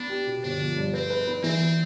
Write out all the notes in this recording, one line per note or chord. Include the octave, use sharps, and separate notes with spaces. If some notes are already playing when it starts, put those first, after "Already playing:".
Already playing: B3 D4
G4
B2
G1 D4
F3
G2
C4 B4
B4
B3
E3 C4
B3